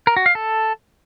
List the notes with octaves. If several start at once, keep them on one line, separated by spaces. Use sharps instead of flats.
A#4
F#4
F5
A4